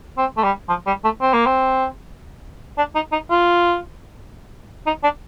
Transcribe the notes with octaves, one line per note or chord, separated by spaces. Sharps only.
C4
A3
G3
F3
G3
A3
C4
A#3
C4
D4
D#4
D#4
F4
D#4
D4